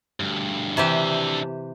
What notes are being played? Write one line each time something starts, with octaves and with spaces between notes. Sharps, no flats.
D2 G2
C3 E3 D4 G4 E5